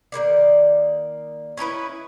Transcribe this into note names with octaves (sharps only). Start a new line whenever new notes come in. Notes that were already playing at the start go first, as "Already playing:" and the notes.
D#3 E3 A#3 D5
C#4 D#4 E4 B4